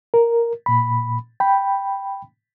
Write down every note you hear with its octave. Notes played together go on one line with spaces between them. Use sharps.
A#4
A#2 B5
G5 B5